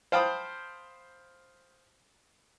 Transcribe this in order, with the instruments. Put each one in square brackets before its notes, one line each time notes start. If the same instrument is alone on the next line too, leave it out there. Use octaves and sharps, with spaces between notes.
[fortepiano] C5 F5 G5 A5 B5 D#6